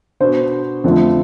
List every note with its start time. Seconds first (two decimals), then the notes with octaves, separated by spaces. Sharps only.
0.20 B2 B3 D4 C5
0.84 F2 D3 F3 A3